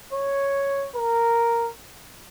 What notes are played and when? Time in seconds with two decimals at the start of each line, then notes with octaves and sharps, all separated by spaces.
0.13 C#5
0.96 A#4